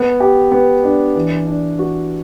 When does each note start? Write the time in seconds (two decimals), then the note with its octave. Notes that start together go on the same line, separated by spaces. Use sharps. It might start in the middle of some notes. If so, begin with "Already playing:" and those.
Already playing: B3
0.20 G4
0.51 B3
0.83 D4
1.15 E3
1.47 D4
1.79 F#4